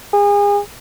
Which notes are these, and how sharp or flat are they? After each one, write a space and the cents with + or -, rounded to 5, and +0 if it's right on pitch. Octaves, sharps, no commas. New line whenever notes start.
G#4 -35